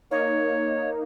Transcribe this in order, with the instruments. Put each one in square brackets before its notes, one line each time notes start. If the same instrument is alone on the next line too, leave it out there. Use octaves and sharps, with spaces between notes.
[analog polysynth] A#3 D#4 [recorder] C#5